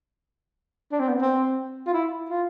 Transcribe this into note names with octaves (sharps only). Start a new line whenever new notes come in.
D4
C4
B3
C4
F4
E4
F4